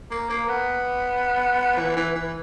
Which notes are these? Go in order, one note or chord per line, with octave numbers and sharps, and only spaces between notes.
A#3
A#3
B3
E3
E3
E3